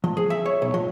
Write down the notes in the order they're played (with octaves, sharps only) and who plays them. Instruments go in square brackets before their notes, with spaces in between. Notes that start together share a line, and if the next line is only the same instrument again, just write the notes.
[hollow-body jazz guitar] F3
G#4
E5
C#5
B1
F3